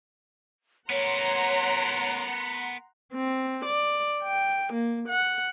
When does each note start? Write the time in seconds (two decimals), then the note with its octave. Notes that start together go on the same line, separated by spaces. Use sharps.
0.90 B3 A#4 C#5 F#5 A#5 C6
3.13 C4
3.65 D5
4.23 G5
4.73 A#3
5.08 F#5